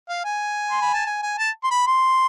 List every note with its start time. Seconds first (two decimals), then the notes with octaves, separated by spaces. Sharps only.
0.09 F5
0.25 G#5
0.71 C6
0.82 B5
0.93 A5
1.06 G#5
1.23 G#5
1.38 A5
1.64 C6
1.71 B5
1.87 C6